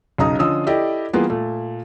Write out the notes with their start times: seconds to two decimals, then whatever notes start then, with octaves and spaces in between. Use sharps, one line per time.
0.18 B1 C#3 D#4 A#5 D#6
0.39 D3 F3 C#4 D#5 D#6 E6
0.67 E4 G4 A4 D5 D#5
1.13 E3 G3 A#3 B3 F4 G#4
1.30 A#2 A3